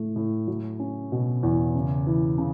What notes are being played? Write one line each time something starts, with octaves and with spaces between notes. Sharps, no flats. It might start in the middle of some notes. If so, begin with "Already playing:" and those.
Already playing: A2 A3
A2
F#3
C#4
B2
E2
C#3
E3
C#3